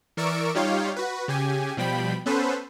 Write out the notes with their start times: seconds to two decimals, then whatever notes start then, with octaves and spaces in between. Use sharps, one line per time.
0.17 E3 A#4 D5 C#6 E6 D7
0.55 G3 D#4 F4 G4 C#5 F5
0.96 F#4 B4
1.28 C#3 G4 G#5
1.77 B2 F3 G3 G5 B5
2.26 B3 C#4 A4 B4 C5